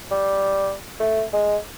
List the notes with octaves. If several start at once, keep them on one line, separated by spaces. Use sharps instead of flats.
G3
A3
G#3